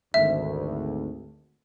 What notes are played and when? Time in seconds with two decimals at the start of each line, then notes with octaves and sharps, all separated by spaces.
0.14 G#1 D2 E5